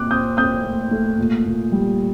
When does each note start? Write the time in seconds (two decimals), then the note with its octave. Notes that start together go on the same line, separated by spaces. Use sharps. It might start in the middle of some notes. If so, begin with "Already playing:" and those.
Already playing: A#2 C4 D6 F#6
0.11 C4 D#6 G6
0.37 C4 D#6 G6
0.64 A3
0.91 A3
1.18 A#2
1.46 A#2
1.72 G3